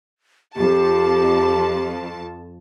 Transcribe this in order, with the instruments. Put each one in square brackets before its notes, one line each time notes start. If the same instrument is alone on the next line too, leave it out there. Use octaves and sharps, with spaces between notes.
[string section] F2 A5 [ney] G4